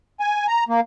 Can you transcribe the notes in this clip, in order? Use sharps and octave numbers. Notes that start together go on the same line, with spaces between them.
G#5
A#5
A#3